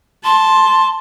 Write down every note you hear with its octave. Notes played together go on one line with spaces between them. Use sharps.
A5 C6